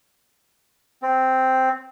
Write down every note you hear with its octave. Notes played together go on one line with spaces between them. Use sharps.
C4